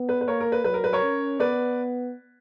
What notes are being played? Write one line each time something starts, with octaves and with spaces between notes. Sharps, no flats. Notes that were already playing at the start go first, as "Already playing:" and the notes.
Already playing: B3
B4
B4
A#3 A#4 C#5
A#4
B4
F#3 B4
A#4
B4
A#4 C#5
C#4
B3 B4 D5